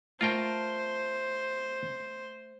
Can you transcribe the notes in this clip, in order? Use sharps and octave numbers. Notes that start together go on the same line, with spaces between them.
A3 F4 A#4 C5 G5 A5